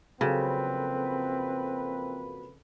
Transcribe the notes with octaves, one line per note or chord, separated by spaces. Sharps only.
F2 C#3 F#3 A#3 C4 A4 B4